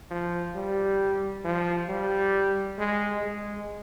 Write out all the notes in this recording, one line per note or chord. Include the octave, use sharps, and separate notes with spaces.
F3
G3
F3
G3
G#3
G#3